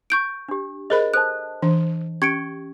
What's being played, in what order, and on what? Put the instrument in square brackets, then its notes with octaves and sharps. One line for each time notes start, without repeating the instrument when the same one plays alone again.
[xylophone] C#6 G6 D7
[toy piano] D4 G4
[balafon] G#4 A#4 B5 [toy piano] C5 D#5
[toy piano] A4 C5 A5 [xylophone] F#6
[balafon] E3 D4
[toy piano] C#4 G4 C#6 [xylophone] G#6 C#7 D7